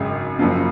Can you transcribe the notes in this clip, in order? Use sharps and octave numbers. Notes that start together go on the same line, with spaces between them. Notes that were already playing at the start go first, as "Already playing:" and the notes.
Already playing: G#1 F#2 C#3 G#3
F#1 F#2 F3 A#3